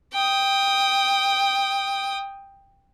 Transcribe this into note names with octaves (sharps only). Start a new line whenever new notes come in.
G5 D#6